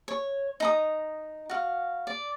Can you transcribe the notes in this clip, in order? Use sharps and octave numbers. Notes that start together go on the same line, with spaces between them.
C#5
D#4 A#5 D#6
F#4 F5
D5